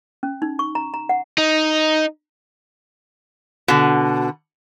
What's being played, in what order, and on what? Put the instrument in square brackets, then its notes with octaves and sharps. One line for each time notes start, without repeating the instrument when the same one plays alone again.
[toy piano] C#4
D#4
C#6
A#5
A#5
F#5
[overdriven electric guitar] D#4
[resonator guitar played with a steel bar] B2 D3